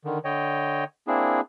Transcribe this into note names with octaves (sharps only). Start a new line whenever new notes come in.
D3 D#3
D3 C#5 D#5 G5
A#3 C4 D4 E4 G#4